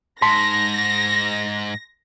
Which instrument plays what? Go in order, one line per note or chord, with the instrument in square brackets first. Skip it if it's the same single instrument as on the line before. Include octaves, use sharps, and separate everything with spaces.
[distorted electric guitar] G#2 [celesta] A5 C6 B6 [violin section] A#6